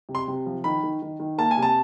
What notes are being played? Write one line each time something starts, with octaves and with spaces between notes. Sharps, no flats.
C3
C6
C3
F3
D#3 B5
D#3
D#3
D#3
A#3 A5
G#5
C3
A5